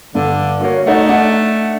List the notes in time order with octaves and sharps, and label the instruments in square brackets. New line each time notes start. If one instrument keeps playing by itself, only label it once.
[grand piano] G2 [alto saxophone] D3
[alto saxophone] A#3 [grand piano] F#4 C#5
[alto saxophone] A3 [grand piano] D#4 F#5
[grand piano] D4 F#5